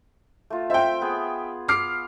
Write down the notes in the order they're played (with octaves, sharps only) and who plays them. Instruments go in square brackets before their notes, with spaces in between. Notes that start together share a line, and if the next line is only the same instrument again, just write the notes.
[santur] A3 F4
[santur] C4 C5 F5 [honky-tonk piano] E5 G5
[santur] B3 G#4
[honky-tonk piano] D6 F6 C7